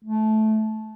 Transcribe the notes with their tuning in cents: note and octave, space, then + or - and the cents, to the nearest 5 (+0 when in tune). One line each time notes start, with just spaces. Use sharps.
A3 -15